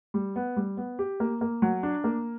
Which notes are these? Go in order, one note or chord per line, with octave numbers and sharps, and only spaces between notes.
G3
B3
G3
B3
G4
A#3
A#3
F#3
D4
A#3